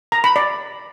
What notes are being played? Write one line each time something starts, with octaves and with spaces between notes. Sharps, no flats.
A#5
B5
D5